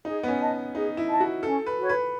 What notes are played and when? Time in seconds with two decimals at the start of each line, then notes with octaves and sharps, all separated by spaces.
0.04 D#4 G#4
0.23 B3
0.28 C#4
0.40 D#5 A5
0.75 D#4 G#4
0.97 E4
1.09 D#5 A5
1.21 F#4
1.43 C#4 A4
1.66 B4
1.78 F#4
1.83 C#5
1.89 B4